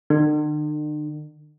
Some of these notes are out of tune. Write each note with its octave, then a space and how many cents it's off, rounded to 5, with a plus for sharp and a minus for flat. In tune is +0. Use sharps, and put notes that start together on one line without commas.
D3 +45